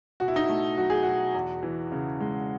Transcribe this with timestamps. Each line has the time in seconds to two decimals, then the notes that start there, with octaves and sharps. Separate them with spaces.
0.20 B2 F#4
0.28 E4
0.36 D#4
0.44 E4
0.49 A3
0.77 F#3 F#4
0.90 G#4
1.03 B2 F#4
1.34 E2
1.63 E3
1.92 C#3
2.20 G#3